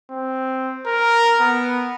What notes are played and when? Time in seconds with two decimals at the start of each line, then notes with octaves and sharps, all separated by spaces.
0.11 C4
0.86 A#4
1.40 B3